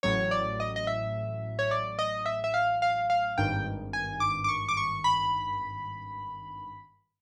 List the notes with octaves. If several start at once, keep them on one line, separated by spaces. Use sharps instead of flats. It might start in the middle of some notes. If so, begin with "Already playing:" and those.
A1 A2 F#3 C#5
D5
D#5
D#5
E5
C#5
D5
D#5
E5
E5
F5
F5
F5
G#1 G2 D#3 G5
G#5
D6
D6
C#6
D6
C#6
B5